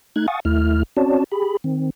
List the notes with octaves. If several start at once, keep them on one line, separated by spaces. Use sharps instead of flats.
A3 D#4 F#6 G#6
F5 F#5 G#5 C#6 D#6 A6
D#2 A3 E4 F6
C4 C#4 F#4 C#5 D5 A5
G4 G#4 B5
D#3 C4